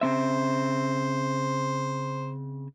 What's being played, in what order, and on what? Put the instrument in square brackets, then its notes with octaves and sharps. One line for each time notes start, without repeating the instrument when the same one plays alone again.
[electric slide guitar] C#3 C4 E5 [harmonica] C5